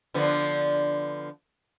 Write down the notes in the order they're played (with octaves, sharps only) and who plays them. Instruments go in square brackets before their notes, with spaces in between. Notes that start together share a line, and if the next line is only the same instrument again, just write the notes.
[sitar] D3 F3 B3